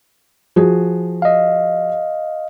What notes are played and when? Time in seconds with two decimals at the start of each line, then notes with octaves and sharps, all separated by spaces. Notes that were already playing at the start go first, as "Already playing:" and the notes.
0.56 F3 F#4 G#4
1.22 D#5 F5